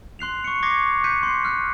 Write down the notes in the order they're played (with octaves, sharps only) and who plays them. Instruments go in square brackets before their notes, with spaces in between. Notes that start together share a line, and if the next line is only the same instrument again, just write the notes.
[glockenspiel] C6 F#6 C7 F7
C#6 C#7
C#6 D6 G#6 A#6 C7 C#7
F#6 G6 B6 C#7 D#7
C6 C7
F6 F#6